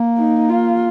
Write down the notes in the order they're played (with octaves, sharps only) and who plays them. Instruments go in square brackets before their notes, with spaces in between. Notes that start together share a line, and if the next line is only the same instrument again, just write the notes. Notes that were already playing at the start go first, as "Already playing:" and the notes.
Already playing: [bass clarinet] A#3
[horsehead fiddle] D#4
F4